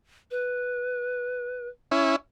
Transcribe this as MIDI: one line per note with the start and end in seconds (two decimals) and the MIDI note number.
0.31 1.68 71
1.91 2.16 61
1.91 2.16 64